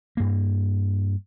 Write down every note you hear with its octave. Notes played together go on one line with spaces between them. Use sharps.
G2 A#3